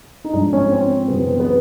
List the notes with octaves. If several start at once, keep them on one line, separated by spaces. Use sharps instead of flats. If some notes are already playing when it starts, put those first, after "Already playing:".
D#4
G#2 F3 D4
C#4
C4
F#2 C#3 E3 B3
C4
B3